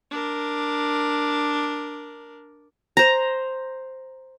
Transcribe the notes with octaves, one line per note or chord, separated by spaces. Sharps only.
D4 A#4
C5 A#5